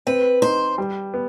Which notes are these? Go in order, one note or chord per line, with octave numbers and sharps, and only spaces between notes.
C4 B4
D#4 C5
G3
B3